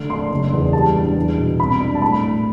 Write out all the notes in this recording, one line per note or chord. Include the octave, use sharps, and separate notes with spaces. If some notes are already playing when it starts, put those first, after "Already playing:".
Already playing: D3 A3
D4 C6
F#1
E2
G3 A5
G2
E2
B2
C2 B5
D4
A5
A2 B5
A2